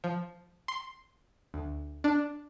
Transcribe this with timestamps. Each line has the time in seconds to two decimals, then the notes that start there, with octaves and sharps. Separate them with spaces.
0.04 F3
0.68 C6
1.54 D2
2.04 D4